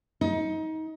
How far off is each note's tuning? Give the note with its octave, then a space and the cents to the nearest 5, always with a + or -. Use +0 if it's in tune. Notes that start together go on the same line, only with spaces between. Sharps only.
D#4 +25